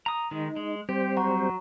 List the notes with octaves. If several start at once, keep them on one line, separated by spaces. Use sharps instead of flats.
A#5 D#6
D#3 G#3 D#4
G#3
G3 C4 G4 C5
F#3 F#5 A#5 C#6